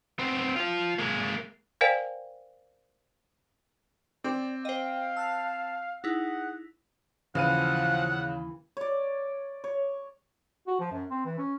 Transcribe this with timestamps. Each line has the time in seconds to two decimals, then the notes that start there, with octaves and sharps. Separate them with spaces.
0.19 B3 C4
0.56 F3 F4
0.98 G#3 A#3
1.81 A#4 C5 D5 F5 G5 G#5
4.24 C4 D5 D6
4.65 C5 D#5 F5 G5
5.17 A5 E6 F#6
6.04 D#4 E4 G#4 F#5
7.35 D#2 C#3 E3 F3 F5 F#5 D#7
8.77 C#5 D5
9.64 C#5
10.67 F#4
10.80 F3
10.92 F#2
11.11 C4
11.25 E3
11.38 C#4